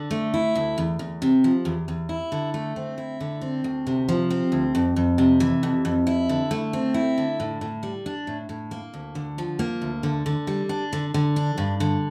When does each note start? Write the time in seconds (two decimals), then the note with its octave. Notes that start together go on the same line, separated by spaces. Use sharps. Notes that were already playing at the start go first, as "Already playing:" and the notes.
Already playing: D3
0.11 A3
0.34 E4
0.55 D2
0.78 E2
0.99 E2
1.22 C3
1.44 F3
1.65 E2
1.88 E2
2.09 E4
2.32 D3
2.54 A3
2.76 C4
2.98 E4
3.20 D3
3.41 C4
3.64 D2
3.87 C3
4.09 F3
4.30 C4
4.52 D2
4.75 F2
4.96 F2
5.18 C3
5.40 E3
5.63 F2
5.85 F2
6.07 E4
6.29 D3
6.51 A3
6.73 C4
6.94 E4
7.18 D3
7.40 A2
7.61 A2
7.83 G3
8.06 D4
8.27 A2
8.49 A2
8.71 A#3
8.94 D2
9.15 D3
9.38 F3
9.59 A#3
9.82 D2
10.03 D3
10.26 D3
10.47 G3
10.69 D4
10.93 D3
11.14 D3
11.36 D4
11.58 G2
11.80 D3